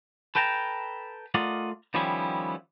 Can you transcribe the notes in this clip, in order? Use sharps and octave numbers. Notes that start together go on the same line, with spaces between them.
A4 B4 G5 A5 A#5
A3 F4 A#4 D5 D#5 F#5
D#3 F3 G3 B3 C#4 E4